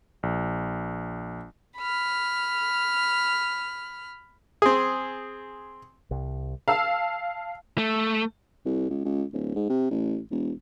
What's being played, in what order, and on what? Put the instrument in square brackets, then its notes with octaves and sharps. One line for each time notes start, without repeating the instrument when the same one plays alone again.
[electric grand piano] A#1
[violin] B5 F6
[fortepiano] C4 G#4
[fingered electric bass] C2
[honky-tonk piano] F5 A5 E6
[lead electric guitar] A3
[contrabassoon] C2
C#2
C#2
D1
G#2
C3
A1
E1